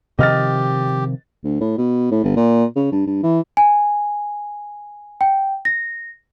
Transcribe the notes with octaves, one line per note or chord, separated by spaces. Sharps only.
C3 D#3 F3 G4 D#5 F6 A6
D2
A2
B2
A2
G1
A#2
C#3
G2
G2
E3
G#5
G5
A#6